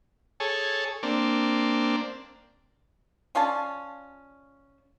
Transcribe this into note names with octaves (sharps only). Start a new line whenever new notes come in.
G#4 A4 C#5
A#3 C4 D4
C#4 F4 D5 A5